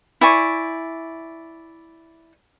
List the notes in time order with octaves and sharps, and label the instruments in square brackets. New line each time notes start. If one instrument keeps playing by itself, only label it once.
[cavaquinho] E4 D5 G#5 C#6